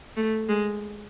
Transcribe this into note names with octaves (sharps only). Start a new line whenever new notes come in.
A3
G#3